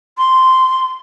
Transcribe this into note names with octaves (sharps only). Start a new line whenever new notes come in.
C6